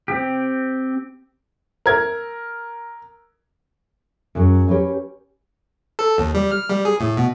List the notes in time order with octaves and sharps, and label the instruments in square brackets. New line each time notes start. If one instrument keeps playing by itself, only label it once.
[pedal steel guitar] C4 G4
[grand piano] A#4 G#6
[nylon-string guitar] F#2 F#3 G#3
C#4 G4 A#4 B4 C#5
[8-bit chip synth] A4
D#2
G3
F6
G3
G#4
A2
B2